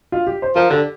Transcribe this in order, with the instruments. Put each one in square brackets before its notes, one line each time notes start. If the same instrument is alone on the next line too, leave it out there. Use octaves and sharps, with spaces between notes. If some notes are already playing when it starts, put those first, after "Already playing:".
[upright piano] F4
G4
C5
[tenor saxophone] F3 [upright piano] A#4
[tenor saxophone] D3 [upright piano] G4